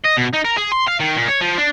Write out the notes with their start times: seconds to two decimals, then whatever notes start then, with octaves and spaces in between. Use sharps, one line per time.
0.04 D#5
0.17 B2
0.33 D#4
0.45 A#4
0.57 G#4
0.72 C6
0.87 F5
0.99 D#3
1.16 A#2
1.28 C#5
1.41 F3
1.58 D4